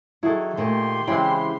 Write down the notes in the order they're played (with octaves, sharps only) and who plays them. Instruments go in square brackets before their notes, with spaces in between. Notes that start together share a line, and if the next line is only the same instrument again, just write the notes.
[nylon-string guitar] D#3 F#3 [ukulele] E4 G#4 A4
[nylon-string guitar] A#2 D#3 A3 [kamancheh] G4 C6
[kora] C#3 G#3 C4 [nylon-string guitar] E3 E4 [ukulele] G5 B5